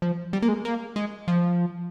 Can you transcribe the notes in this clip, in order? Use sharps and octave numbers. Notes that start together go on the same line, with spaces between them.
F3
G3
A#3
G#3
A#3
G#3
F3